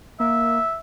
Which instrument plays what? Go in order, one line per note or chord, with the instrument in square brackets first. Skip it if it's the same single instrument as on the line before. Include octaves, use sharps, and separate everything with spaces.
[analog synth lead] A#3 [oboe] E5